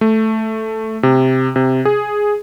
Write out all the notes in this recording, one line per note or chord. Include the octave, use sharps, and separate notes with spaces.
A3
C3
C3
G#4